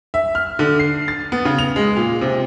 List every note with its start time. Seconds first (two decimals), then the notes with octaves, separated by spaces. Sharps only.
0.14 E5
0.35 F6
0.59 D3
0.79 C7
1.08 A6
1.32 B3
1.45 C#3
1.59 F7
1.76 G#3
1.97 A#2
2.21 C3